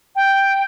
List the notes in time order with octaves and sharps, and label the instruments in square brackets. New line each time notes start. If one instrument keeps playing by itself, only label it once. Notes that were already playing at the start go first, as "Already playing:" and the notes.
[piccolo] G5